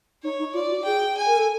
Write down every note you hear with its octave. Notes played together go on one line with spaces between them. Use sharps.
D#4 C#5
D#4
F4 D5
F#4
G#4 G5
G#5
A#4
A4